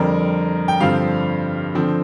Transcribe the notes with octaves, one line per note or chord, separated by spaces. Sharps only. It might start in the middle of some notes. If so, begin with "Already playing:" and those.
Already playing: F2 D3 G3 C4 A#4
G5
G2 D3 F3 C4 F5
D3 F3 C4